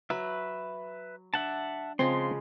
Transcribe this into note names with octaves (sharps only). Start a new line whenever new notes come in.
F#3 B4 E5 B5
D4 E5 F#5 A5
C#3 F3 G#3 C4 C6